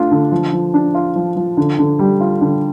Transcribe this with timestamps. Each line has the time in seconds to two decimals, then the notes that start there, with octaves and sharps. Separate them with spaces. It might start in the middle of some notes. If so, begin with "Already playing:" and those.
Already playing: A3 D4 F4
0.11 D3
0.32 F3
0.53 F3
0.74 D4
0.95 F4
1.16 F3
1.37 F3
1.57 D3
1.79 D3
1.99 G3
2.21 F4
2.41 D3